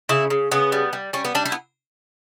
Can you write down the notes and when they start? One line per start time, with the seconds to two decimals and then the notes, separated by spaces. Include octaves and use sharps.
0.09 C#3 E4
0.30 C#3
0.51 C#3 B3
0.72 G3
0.93 G3
1.13 G3 C#4
1.25 B3
1.35 G3 D4
1.45 E4
1.52 B3